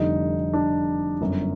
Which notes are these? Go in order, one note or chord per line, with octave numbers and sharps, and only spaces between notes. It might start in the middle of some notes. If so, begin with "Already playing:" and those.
Already playing: F1 F2 D3 G3 D#4
D4
G1 F#2 D3